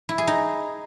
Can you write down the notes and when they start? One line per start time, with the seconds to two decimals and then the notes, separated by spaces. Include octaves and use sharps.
0.09 E4
0.18 G#4
0.27 D#4